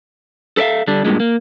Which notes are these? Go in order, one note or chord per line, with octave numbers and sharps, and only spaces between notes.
A4 B4 D5 E5 F5
D3 G3 D4
G2 A#2 G#3
A#3